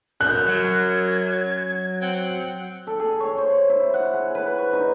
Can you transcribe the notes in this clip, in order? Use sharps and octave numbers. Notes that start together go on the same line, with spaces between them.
F#2 F#6 G6
F#3 G#6
C4 F#5
A4
G#4
C#5
C5
E4
F#5
G#4
B4
C#6
D#4